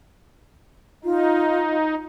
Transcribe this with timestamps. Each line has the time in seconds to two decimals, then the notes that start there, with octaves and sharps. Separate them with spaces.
1.04 D#4 F4